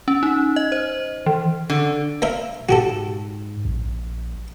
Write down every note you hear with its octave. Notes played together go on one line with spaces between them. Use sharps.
C#4
D#4
D#5
C5
E3
D3
A#3 A#4 E5
G#2 F#4 G4 A4
A#1